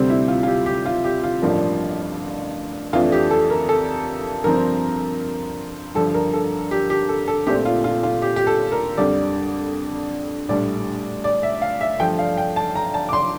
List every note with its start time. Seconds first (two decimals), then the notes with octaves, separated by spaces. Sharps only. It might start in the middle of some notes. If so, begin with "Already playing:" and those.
Already playing: D2 C3 G3 C4
0.10 E4
0.28 F4
0.43 F4
0.47 G4
0.66 G4
0.86 F4
1.04 G4
1.24 F4
1.42 A1 G2 F3 A#3 D4
2.93 F2 E3 A3 D4 F4
3.12 G4
3.31 A4
3.50 A#4
3.69 A4
4.44 G2 F3 C4 A#4
5.95 G2 D3 F3 A4
6.14 A#4
6.33 A4
6.71 G4
6.90 G4
7.09 A4
7.28 A4
7.47 A#1 A#2 A3 C4 G4
7.65 F4
7.84 F4
8.03 F4
8.22 G4
8.36 G4
8.47 A4
8.72 A#4
8.97 F2 D3 G3 D5
10.49 A#1 A2 G3 D4 D5
11.24 D5
11.43 E5
11.62 F5
11.81 E5
11.99 G2 F3 A3 D4 G5
12.19 F5
12.37 G5
12.56 A5
12.75 A#5
12.94 A5
13.09 D6
13.13 C6